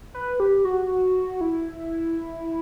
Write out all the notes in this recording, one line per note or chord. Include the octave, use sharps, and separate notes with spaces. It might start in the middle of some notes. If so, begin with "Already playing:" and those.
B4
G4
F#4
E4